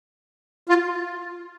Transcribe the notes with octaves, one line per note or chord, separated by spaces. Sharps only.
F4